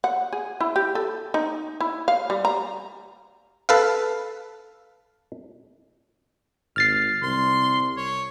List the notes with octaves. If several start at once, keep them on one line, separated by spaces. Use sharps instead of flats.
F#5
G#4
E4
G4
A4
D#4
E4
F5
G3
A#5
A4 B4 F5
G#1 F6 A6 C7
C2 C6
C#5